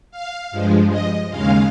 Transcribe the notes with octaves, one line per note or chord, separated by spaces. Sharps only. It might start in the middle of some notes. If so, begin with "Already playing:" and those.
F5
G2 F3 G#3
D#5
D#2 C#3 G#3 F5